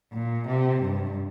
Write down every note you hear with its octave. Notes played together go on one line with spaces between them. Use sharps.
A#2
C3
G2